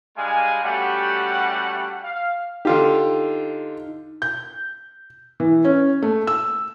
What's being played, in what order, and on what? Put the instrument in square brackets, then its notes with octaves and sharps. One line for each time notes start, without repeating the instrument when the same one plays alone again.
[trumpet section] G3 G#3 D4 F5 G#5
G3 A3 C#4 F#4 G4 F#5
F5
[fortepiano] D3 F4 G4 [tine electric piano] D#4
[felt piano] G6
E3
C#4
A3
E6